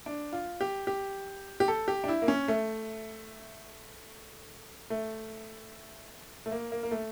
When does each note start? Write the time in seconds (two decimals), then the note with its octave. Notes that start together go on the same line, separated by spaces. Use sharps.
0.06 D4
0.33 F4
0.61 G4
0.87 G4
1.60 G4
1.68 A4
1.88 G4
2.04 D4
2.08 E4
2.22 A#3
2.28 C#4
2.48 A3
4.90 A3
6.46 A3
6.51 A#3
6.72 A#3
6.83 A#3
6.91 A3